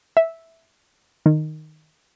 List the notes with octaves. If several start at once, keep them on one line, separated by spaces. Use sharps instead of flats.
E5
D#3